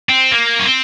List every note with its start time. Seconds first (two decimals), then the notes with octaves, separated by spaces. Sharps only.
0.09 C4
0.31 A#3
0.59 C#4
0.65 C4